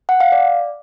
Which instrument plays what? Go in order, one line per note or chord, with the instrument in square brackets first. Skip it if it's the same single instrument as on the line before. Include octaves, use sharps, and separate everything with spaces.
[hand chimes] F#5
F5
D5